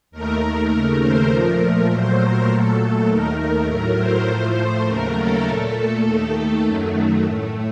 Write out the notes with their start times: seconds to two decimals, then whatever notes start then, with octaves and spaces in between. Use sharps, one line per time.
0.11 D#2 D#3 A3 A#4
0.71 D#2 C#3 A3
1.01 C5
1.30 A#2 F3 A3 A#4
1.60 A#4
1.89 A#2 F#3 A3 C5
2.19 A#4
2.48 A#2 F#3 A3 A4
3.07 D#2 D#3 A3 A#4
3.37 A#4
3.67 A2 F#3 A3
3.97 C5
4.26 A2 F3 A3
4.85 D#2 C#3 F#3 A3 A#4
5.15 A4
5.44 A#2 A3 A4
6.03 D#2 D#3 A3
6.63 F#2 D#3 F#3 A3
7.23 A2 A3